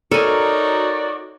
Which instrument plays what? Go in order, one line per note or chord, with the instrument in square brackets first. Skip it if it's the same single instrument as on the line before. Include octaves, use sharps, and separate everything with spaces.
[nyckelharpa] D#4 C#5 [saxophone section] F#4 D5 [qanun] A4 G#5 [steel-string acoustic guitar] A#4